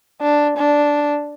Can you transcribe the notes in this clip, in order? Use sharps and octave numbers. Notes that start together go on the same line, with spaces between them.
D4
D4